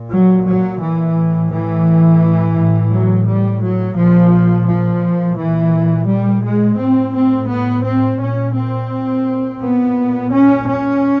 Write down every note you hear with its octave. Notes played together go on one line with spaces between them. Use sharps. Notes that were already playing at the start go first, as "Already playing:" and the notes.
Already playing: A#2
F#3
F#3
E3
A2
E3
A2
F#3
G3
F#3
A#2 F3
F3
A#2 E3
G3
G#3
A2 C4
C4
B3
C4
A#2 C#4
C4
A#2 B3
C#4
C#4